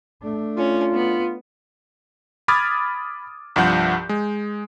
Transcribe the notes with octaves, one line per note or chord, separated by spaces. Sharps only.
A3 D4
C#4 F4
B3
B5 D6 D#6 F6 G#6 A6
C2 G2 F3 F#5 G6
G#3